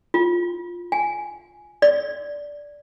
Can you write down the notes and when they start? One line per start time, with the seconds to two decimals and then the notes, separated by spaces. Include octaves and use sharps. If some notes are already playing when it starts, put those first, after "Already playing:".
0.14 F4
0.92 G#5
1.82 D5